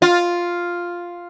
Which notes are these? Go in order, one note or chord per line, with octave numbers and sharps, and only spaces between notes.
F4